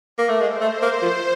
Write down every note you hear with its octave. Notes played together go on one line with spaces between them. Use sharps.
A#3
A3
G#3 C5
A3
A#3
F3